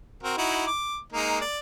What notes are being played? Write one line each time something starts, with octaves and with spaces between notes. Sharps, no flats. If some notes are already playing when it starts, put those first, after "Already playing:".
C4 F#4 A#4
D#4 E4 F#4
D6
G#3 A#3 D#4
D5